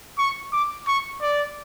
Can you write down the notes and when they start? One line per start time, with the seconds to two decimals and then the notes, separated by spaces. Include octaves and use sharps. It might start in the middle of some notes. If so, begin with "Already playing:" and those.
0.18 C#6
0.53 D6
0.87 C#6
1.22 D5